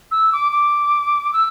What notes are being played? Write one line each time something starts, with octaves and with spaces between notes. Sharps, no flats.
E6
D6
D6
E6